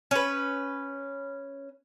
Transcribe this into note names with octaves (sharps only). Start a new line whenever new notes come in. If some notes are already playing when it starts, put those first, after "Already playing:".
C#4 B4